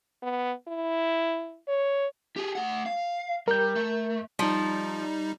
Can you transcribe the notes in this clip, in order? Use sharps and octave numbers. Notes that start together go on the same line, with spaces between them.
B3
E4
C#5
G4 G#4
A3 F#5
F5
G3 A#4 G6
A3
F3 G3 D#4